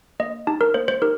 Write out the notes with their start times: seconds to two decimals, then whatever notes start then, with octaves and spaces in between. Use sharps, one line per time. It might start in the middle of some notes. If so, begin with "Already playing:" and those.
0.20 A#3 D#5
0.47 D#4 G4 A5
0.61 A#4
0.74 A#3 C5
0.88 C5
1.02 D#4 G4 A#4